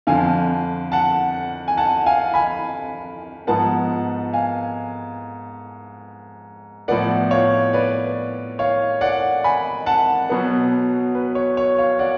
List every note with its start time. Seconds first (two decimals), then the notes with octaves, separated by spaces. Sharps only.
0.07 F2 D3 F3 F5 G#5
0.92 F#5 A5
1.68 G#5
1.77 F#5 A5
2.06 F5 G#5
2.34 G#5 B5
3.47 G#2 F3 B3 F#5 A5
4.33 F5 G#5
6.88 A2 F3 B3 D5 F#5
7.31 C#5 F5
7.73 B4 D5
8.59 C#5 F5
9.01 D5 F#5
9.44 G#5 B5
9.86 F#5 A5
10.29 B2 F#3 B3
11.15 B4
11.35 C#5
11.57 C#5
11.78 C#5 F5
11.99 D5 F#5